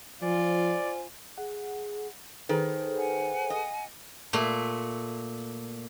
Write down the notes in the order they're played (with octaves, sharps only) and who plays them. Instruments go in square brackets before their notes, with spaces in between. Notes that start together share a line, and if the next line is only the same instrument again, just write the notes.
[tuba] F3 [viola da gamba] F4 [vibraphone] C5 G#5 [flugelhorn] D5
[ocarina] G#4 [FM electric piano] F#5
[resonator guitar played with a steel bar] D#3 [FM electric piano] G#4 A4 B4 [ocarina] C5
[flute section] F#5 G#5
[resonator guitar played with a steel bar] D#5
[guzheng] A#2 A3